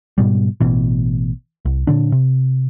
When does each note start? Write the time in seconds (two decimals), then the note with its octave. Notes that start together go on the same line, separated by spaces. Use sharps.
0.18 G#2 B2 G3
0.61 A1 B2 E3
1.65 C2
1.87 A#2 D3 D4
2.12 C3